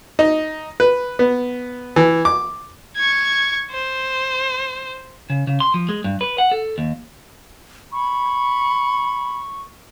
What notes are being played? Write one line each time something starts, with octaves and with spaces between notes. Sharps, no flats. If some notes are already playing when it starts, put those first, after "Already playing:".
D#4
B4
B3
E3
D6
C#6 G#6
C5
C#3
C#3
C6
F3
G#3
G2
B4
F#5
A4
D#2
B5 C#6